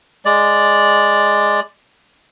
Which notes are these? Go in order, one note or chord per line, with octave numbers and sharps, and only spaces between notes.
G#3 D5